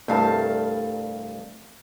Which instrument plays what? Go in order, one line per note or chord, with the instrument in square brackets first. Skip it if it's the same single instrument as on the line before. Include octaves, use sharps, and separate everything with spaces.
[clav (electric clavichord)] C2 G2 [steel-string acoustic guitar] A3 F5 A5